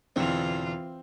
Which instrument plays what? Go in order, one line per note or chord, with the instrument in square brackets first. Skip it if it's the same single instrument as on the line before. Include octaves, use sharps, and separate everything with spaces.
[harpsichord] E2 B2 D3 [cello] E3 F4 [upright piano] C4